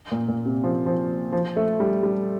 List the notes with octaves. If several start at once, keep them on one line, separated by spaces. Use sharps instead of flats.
A#2
A#2
C3
F3
F3
F3
A3
G3
G3